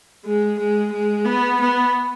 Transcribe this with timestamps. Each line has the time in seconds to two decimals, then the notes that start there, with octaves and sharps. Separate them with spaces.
0.25 G#3
0.58 G#3
0.92 G#3
1.25 B3
1.60 B3